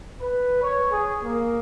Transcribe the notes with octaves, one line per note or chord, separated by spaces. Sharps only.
B4
C#5
G#4
A#3